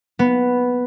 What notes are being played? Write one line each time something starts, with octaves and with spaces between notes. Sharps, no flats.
B3